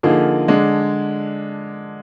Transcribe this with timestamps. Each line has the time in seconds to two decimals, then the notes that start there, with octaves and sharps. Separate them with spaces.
0.03 D3 F3 A#3 D#4 G#4
0.48 D3 G#3 D4